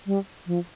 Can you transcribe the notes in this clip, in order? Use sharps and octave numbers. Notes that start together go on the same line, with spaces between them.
G3
F3